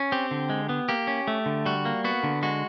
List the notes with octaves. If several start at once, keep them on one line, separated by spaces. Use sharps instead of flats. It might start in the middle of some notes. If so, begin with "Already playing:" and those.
Already playing: C#4
C4 G4
D3
G#3
B3
A#3 G4
C#4
A3
D3
G3 F#4
A#3
B3 F#4
D3
G#3 F#4